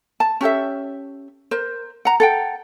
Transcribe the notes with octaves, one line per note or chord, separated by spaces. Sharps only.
A5
C#4 G4 A4 E5
A#4 C5
F#5 A#5
A4 F#5 G5